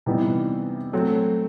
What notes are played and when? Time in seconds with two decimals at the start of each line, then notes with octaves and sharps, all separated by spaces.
0.06 C3 E3 G3 B3 D#4
0.93 F#3 A3 C4